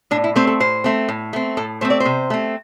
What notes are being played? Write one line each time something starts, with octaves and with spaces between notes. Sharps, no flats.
A2 D4
E4
A3 C4 C5
A4
A2 C5
A3 C4
A2
A3 C4
A2 A4
A3 C4 C5
D5
C5
C3
A3 C4